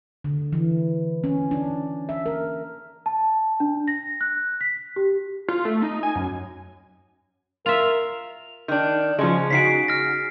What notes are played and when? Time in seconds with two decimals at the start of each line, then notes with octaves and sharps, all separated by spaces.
0.24 D3
0.52 E3
1.24 C#4
1.51 D4
2.09 E5
2.26 A#4
3.06 A5
3.60 D4
3.88 A#6
4.21 F#6
4.61 B6
4.96 G4
5.49 F4
5.65 A3
5.82 D#4
6.03 G#5
6.15 F#2
7.66 F4 A#4 E5 F7
8.68 D#3 D4
9.18 C#3 F3 G#3 C#4
9.50 C#3 D#4 F#4 B6 C7 D7
9.88 F6 A#6